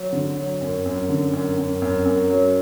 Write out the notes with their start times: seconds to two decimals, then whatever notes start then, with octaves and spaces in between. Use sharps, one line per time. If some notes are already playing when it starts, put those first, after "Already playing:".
Already playing: F#3
0.12 D3
0.37 F#3
0.61 F#2
0.86 F#2
1.09 D3
1.33 F#2
1.57 F#2
1.82 F#2
2.05 F#2
2.30 F#3